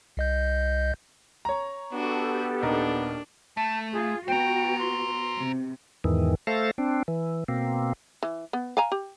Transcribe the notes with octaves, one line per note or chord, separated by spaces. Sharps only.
C2 D#5 G6
C#5 A#5
B3 D4 F#4 G4 A4
D#1 D4 D#4 A#4
A3 A5
F4 G#4
B3 F#4 C5 G5 A#5
C6
C3
E2 G#2 D#3 E3
A3 A4 C5 F5 A6 A#6
C4 D4
E3
B2 A#3 C4
E3
B3
F5 G#5 A#5
G4